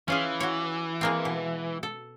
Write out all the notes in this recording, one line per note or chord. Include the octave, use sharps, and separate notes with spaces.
E3 C#4 F4 G#4
F#4 C#5
G#3 A#3 C4
B2
A4